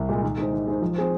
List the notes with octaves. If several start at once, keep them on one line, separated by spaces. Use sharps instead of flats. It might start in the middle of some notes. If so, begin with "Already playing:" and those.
Already playing: C2
A#2 G#3
D#3
G#3 D#4 C5
D#3
G#3 D#4 C5
F3
C4 G#4 C5